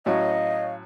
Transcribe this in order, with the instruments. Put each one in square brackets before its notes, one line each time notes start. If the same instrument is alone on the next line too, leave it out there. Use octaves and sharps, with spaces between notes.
[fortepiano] A2 F#3 C#4 [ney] D#5 [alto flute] F5